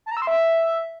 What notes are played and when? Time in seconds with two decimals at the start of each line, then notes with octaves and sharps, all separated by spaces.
0.06 A5
0.11 A#5
0.17 E6
0.22 C6
0.27 E5